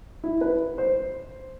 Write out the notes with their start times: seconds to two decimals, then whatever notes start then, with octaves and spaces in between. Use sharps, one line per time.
0.24 E4
0.41 B4
0.78 C5